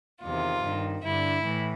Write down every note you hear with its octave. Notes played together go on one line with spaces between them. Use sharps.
E2 C3 D#3 F4
G2 D#3
G2 D3 E4
A2 E3